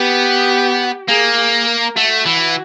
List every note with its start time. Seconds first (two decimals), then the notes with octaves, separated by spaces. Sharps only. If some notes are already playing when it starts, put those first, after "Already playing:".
Already playing: B3 G4
1.08 A#3 G#4
1.37 G#4
1.67 A#4
1.96 A3 F#4
2.26 E3